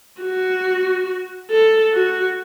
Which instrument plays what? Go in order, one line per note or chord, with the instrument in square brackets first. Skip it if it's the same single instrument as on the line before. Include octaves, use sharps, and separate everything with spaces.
[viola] F#4
A4
F#4